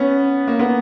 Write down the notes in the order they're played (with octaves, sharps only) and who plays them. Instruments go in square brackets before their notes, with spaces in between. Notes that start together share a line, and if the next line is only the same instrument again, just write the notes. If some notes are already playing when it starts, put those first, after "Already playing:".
Already playing: [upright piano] B3 C#4
A#3
B3